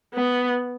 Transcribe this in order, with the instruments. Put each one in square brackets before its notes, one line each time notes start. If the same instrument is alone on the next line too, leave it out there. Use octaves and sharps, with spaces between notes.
[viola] B3